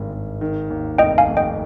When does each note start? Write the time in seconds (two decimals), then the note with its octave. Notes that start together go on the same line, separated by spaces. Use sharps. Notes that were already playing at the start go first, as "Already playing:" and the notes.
Already playing: G#1 G2 D#3
0.13 G#1
0.41 D#3
0.70 D#2
0.98 F1 D#5 G5
1.18 F5 G#5
1.27 F1
1.37 D#5 G5